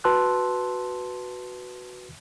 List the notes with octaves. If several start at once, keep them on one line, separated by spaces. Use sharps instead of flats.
F#4 B4 A5 C6 E6 F#6